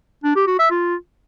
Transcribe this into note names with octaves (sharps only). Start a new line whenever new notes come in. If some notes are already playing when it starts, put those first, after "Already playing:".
D4
G4
F#4
E5
F4